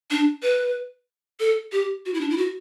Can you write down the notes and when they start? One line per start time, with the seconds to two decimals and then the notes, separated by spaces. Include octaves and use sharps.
0.11 D4
0.43 B4
1.40 A4
1.72 G4
2.06 F#4
2.14 E4
2.21 D4
2.30 E4
2.38 F#4